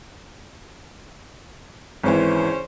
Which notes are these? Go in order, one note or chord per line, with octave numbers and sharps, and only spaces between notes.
G#1 C#3 E3 C#4 C5